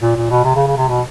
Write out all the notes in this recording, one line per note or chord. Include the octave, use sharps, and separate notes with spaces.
A#2
A#2
B2
C3
C#3
C#3
C3
B2